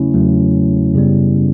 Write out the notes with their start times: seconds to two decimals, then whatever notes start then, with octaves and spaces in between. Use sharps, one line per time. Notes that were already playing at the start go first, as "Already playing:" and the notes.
Already playing: E2 C#3 F#3 A3 C#4 E4
0.14 E2 C#3 F#3 A3
0.94 F#2 C#3 G3 B3